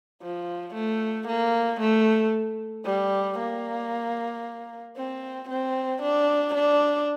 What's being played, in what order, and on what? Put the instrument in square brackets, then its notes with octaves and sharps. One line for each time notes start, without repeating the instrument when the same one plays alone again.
[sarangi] F3
A3
A#3
A3
G3
A#3
C4
C4
D4
D4